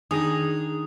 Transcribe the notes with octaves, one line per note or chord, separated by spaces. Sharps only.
D#3 D4 D#4 G#4 D#6